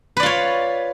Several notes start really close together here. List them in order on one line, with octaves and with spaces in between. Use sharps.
B4 D5 F4 C#5